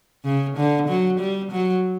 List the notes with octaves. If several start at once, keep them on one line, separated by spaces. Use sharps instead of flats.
C#3
D3
F#3
G3
F#3